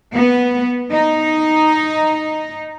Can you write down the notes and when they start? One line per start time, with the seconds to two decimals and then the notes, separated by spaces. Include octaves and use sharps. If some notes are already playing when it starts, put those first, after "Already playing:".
0.15 B3
0.91 D#4